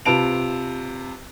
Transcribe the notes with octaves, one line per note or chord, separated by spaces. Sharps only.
C3 F4 B4 A5 D7 F7